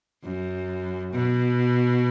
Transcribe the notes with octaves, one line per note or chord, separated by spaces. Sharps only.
F#2
B2